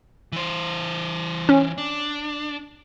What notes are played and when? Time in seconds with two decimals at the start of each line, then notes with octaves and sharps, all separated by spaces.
0.32 E3 C5
1.49 C#4
1.78 D4